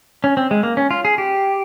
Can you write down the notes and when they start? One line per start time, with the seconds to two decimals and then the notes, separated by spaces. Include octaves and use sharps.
0.24 C#4
0.37 C4
0.51 G#3
0.63 A#3
0.77 C#4
0.91 F4
1.05 G#4
1.18 G4